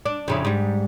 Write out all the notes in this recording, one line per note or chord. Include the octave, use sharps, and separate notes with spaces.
D4
F2 C#3 E4
G#2 G3